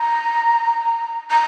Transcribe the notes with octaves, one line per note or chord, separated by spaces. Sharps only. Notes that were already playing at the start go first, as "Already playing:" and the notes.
Already playing: A#5
A#5